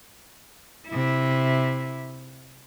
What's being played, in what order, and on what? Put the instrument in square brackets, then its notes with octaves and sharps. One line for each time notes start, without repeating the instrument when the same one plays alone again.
[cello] C3 E4